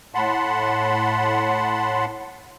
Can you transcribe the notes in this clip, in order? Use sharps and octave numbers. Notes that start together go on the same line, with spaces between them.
A2 F#5 A5 B5 C6